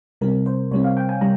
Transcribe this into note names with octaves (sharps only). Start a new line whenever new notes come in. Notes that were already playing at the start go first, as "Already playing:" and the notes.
C3 G3 C4 A#4
C5
C3 G3 C4 C#5
F5
G5
G#5
C3 G3 A#5